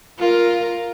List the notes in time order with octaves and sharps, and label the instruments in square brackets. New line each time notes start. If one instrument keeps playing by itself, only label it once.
[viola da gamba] F4 A#4